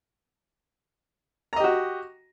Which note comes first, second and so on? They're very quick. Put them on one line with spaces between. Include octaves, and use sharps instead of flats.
A#5 D#5 G4 F#4